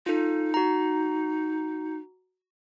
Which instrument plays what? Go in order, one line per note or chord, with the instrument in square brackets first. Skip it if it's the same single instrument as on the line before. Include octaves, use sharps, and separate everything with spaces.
[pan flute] D#4 [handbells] F4 A4
[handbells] F#4 A#5